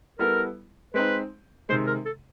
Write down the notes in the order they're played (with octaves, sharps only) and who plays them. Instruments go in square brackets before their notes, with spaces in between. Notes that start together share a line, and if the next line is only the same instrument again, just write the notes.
[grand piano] G3 B3 E4 A4 [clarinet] A#4
[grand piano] G#3 C4 D#4 [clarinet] B4
[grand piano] C3 D#3 G#3 [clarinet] C5
[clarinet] A#4
A4